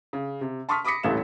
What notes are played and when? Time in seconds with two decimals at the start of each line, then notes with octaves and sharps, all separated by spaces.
0.13 C#3
0.41 C3
0.69 A5 C6 C#6 D#6 F6 B6
0.84 B5 D6 D#6 A#6 B6 C#7
1.03 D#1 A1 E3 A3 F5 E7